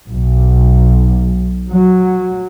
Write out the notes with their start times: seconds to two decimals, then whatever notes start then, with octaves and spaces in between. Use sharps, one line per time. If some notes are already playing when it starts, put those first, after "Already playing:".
0.10 B1
1.71 F#3